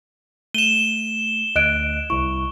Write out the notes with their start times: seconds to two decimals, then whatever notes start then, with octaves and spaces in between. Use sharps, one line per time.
0.54 A3 D#7 E7 G7
1.56 D2 D#5 F#6 D7
2.10 C2 E4 C#6